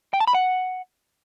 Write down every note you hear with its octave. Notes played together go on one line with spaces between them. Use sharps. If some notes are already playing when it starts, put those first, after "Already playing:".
G5
A5
B5
F#5